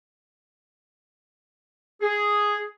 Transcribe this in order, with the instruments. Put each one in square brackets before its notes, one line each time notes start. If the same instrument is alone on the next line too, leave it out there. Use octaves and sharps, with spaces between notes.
[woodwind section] G#4